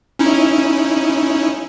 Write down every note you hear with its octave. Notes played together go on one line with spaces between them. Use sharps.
C#4 D#4 E4